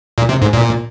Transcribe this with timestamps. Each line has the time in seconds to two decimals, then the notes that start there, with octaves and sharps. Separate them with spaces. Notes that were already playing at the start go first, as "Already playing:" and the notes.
0.18 A#2
0.29 C3
0.42 G#2
0.53 A#2